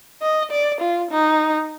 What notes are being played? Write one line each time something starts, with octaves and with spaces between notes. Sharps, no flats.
D#5
D5
F4
D#4